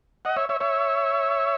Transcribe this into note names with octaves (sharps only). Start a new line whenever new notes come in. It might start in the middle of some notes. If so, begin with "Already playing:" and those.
D#5 F#5
C#5 E5
C#5 E5
C#5 E5